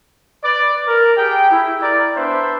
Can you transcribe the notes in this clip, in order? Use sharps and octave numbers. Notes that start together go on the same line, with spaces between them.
B4 D5
A#4
G4 G#4 G5
E4
A#4 D5
B3 D4 B4 C5 E5